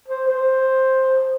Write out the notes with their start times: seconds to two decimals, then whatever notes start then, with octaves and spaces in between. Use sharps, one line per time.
0.08 C5
0.28 C5